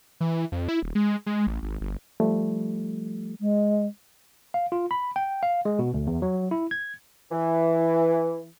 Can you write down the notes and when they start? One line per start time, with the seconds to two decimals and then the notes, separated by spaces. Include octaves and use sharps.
0.21 E3
0.52 F2
0.68 E4
0.83 D#1
0.95 G#3
1.26 G#3
1.47 A1
1.63 G#1
1.81 G1
2.20 F3 G3 A3
3.40 G#3
4.54 F5
4.72 F4
4.91 B5
5.16 G5
5.43 F5
5.65 G#3
5.79 B2
5.94 D2
6.07 E2
6.22 F#3
6.51 E4
6.71 G#6
7.31 E3